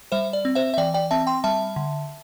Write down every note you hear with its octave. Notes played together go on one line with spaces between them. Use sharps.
G3 C5 E5
D5
C4
C5 E5
E5
E3 D5 G5
D5 G5
C4 E5 A5
G5 C6
G3 E5 A5
D3